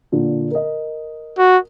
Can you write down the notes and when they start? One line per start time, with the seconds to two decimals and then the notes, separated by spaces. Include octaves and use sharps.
0.12 A#2 D3 D4
0.51 A#4 D#5
1.38 F#4